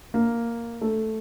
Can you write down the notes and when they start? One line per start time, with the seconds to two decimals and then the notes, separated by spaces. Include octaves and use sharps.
0.14 A#3
0.81 A3